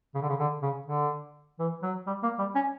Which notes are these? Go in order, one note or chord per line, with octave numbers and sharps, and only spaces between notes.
C#3
D3
C#3
D3
C#3
D3
E3
F#3
G3
A#3
G3
C#4